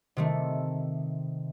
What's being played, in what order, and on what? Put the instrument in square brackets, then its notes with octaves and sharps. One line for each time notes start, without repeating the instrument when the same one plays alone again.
[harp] C3 D#3 A3